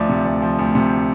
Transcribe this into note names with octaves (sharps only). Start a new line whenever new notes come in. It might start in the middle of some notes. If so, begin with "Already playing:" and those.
Already playing: D2 F3 D5
C3
D2
F3
D2
C3